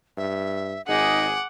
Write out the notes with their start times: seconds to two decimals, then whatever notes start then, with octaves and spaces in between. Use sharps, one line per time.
0.17 G2 E5
0.87 G#1 D#4 G#4 F#5 D6